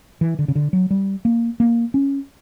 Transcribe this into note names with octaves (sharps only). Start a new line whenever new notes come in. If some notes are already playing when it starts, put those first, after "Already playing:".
E3
D3
C#3
D3
F#3
G3
A#3
A#3
C#4